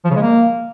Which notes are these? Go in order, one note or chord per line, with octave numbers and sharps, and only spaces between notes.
F3
C#3
G#3
A#3